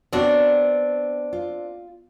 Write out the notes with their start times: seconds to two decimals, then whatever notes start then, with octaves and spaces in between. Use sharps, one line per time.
0.13 B3 C4 D4 F#4 C#5
1.33 F4